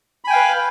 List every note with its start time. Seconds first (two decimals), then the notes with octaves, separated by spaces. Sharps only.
0.25 B5
0.27 G#5
0.30 G5
0.33 F5
0.36 B4